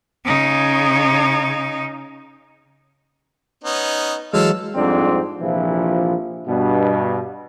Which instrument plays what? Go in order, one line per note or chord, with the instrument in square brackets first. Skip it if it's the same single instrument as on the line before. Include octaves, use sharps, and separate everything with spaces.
[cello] C#3 D#4
[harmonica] B3 C#4 D#4
[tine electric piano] E3 F#3 G#3 [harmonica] A4 F5 E6
[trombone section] F2 G#2 G3 C4 D4
A#1 C3 E3 F3
G2 B2